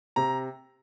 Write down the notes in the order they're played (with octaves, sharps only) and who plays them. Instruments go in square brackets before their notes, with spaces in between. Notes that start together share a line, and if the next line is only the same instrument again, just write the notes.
[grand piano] C3 A#5